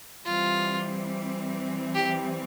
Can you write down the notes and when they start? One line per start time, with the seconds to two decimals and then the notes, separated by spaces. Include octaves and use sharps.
0.24 E3 G3 C4 F4
1.94 G4